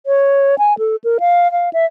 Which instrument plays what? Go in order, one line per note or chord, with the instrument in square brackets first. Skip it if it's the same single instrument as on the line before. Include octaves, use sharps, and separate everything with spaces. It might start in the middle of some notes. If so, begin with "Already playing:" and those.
[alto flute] C#5
G#5
A4
A#4
F5
F5
E5